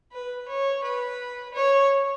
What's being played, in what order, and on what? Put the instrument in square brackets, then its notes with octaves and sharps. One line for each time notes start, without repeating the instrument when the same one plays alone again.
[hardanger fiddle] B4
C#5
B4
C#5